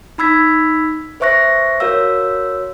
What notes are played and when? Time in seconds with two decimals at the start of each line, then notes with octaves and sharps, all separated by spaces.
0.18 D#4 B5 E6 G#6 B6
1.20 B4 C5 E5 C#6 F#6 A#6
1.80 F#4 A#4 C#5 F5 E6